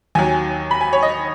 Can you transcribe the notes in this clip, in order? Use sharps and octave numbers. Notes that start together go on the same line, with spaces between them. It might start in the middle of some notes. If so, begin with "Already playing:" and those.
D#2 D#3 F#3 G#5
B5
G#5
C#5
D#5